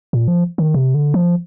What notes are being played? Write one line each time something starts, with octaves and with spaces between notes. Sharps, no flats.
A#2
F3
D#3
C3
D3
F3